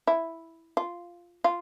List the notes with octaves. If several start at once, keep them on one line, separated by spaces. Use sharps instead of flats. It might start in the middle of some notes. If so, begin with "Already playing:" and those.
E4
F4
F4